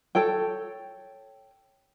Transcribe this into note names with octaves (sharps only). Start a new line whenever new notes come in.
A4 C#5 G5